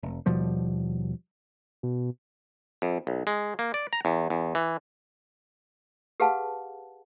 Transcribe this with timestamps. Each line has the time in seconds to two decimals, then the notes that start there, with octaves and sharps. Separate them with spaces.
0.03 F1
0.26 D#2 B2 F3 G3
1.83 B2
2.82 F2
3.07 B1
3.27 G#3
3.59 A#3
3.74 D5
3.93 A#5
4.05 E2
4.30 E2
4.55 E3
6.20 G4 G#4 B4 F5 F#5 A5